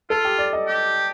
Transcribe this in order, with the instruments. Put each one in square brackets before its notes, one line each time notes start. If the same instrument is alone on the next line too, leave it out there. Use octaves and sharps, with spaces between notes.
[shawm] F4 [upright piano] A4
[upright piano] G4
D5
D#5
[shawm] G4